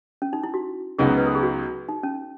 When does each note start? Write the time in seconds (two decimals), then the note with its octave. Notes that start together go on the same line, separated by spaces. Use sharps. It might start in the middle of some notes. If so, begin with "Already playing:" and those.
0.22 C#4
0.33 D#4
0.44 E4
0.54 F#4
0.99 C#2 C#3 F#3 B3 D#4 G#4
1.17 B4
1.26 A4
1.35 G#4
1.43 F#4
1.89 D#4
2.03 C#4